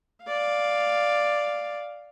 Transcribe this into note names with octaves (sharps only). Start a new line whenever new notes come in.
D5 F5